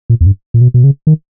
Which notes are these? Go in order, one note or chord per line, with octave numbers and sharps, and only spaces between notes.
A#2
E2
G2
A#2
B2
B2
C#3
D#3